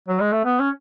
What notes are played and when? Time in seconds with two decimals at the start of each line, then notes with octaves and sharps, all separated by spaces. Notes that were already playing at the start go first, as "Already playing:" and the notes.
0.08 F#3
0.20 G#3
0.32 A3
0.45 B3
0.59 C#4